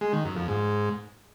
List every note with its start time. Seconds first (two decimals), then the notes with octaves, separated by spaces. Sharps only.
0.01 G#3
0.13 D#3
0.25 F#2
0.36 F2
0.48 G#2